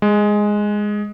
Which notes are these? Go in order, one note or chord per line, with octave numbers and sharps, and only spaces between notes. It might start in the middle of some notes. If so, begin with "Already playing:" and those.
G#3